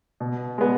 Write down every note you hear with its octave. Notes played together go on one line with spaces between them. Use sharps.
B2
G#3 B3